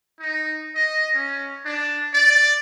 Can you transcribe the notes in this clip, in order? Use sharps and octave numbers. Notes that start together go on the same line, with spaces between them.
D#4
D#5
C#4
D4
D5